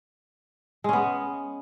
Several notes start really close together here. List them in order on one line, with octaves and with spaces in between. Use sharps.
G#3 C#4 B3